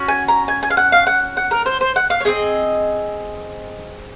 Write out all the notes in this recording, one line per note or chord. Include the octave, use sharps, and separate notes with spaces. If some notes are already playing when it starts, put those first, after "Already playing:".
Already playing: C#4 F#4
G#5
A#5
G#5
G#5
F5
F#5
F5
F#5
F#5
A#4
C5
C5
F#5
F5
C#5
C4 D#4 G#4 D#5